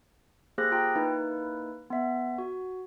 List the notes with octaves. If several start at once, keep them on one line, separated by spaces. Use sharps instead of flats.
A#3 G4 G#4 C5 F#6 A#6
F4 G5 A#5
A#3 D#4 E4 B4
B3 E5
F#4